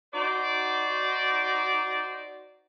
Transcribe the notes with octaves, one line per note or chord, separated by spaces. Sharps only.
D#4 F#4 C5 D5